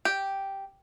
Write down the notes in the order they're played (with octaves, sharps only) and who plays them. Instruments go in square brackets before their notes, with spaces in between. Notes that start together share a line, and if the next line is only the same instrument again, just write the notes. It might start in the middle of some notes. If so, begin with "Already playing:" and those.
[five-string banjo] G4